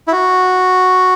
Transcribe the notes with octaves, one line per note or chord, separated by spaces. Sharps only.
E4
F#4